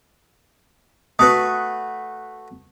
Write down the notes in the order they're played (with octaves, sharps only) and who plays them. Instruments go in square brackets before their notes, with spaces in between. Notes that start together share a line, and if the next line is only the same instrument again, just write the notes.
[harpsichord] A3 F#4 B4 [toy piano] D#6